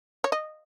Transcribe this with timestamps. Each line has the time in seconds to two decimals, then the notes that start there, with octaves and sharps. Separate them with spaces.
0.24 C#5
0.32 D#5